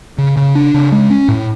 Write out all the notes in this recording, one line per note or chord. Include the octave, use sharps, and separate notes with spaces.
C#3
C#3
D4
C#3
G#3
C#4
A2